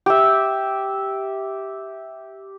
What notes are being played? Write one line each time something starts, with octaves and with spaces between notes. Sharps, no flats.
G4 E5